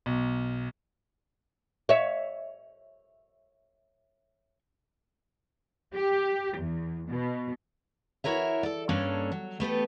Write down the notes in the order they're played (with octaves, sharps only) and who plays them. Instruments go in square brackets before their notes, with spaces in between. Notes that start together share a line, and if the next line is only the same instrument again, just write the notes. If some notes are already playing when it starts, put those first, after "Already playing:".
[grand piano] B1
[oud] C#5 E5
[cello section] G4
E2
B2
[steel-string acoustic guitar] E4 F#4 A#4 C#5 E5
A4 D5
G2 A#3 C#4 D4 A4 C#5
F#3
A3 B3 G4 A4